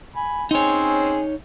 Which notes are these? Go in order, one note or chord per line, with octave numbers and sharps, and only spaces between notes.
G#5 B5
C4 C#4 D#4 G#4 C#5